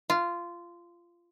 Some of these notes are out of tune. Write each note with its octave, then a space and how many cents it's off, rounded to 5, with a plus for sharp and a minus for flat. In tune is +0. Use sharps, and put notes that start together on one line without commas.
F4 -15